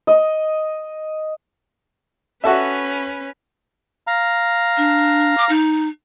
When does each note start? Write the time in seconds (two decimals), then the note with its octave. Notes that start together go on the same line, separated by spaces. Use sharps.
0.07 D#5
2.44 C#4 F#4 A4 B4 E5
4.07 F5 A#5
4.77 D4
5.38 D6
5.49 D#4